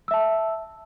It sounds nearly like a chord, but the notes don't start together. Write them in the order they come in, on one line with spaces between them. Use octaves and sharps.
E6 E5 A5